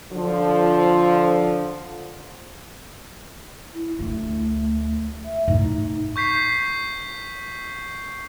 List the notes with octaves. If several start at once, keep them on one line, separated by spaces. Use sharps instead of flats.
D3 F3
E4
D2 A3 D4
E5
A2 D#4
C#6 G6 B6 C7